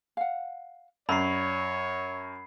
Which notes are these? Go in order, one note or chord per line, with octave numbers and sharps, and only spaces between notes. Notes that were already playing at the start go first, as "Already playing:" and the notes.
F5 F#5
F#2 C#5 D5 F5 A#5 B5 C7